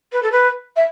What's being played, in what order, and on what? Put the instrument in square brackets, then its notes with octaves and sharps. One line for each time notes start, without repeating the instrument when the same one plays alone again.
[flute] B4
A4
B4
E5